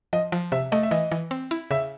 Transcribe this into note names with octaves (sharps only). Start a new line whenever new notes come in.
F3 D#5
F3
C3 E5
A3 D#5
E5
E3 D#5
E3
C4
E4
C#3 E5